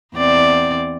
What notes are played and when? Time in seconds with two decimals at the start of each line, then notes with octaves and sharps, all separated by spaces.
0.15 E2 C4 D5